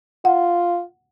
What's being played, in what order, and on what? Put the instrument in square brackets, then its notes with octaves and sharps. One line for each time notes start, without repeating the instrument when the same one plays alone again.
[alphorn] F4 [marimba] F#5